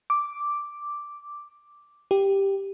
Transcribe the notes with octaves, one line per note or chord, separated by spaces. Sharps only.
D6
G4